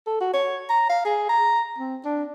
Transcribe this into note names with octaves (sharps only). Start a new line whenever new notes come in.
A4
F#4
C#5
A#5
F5
G#4
A#5
C4
D4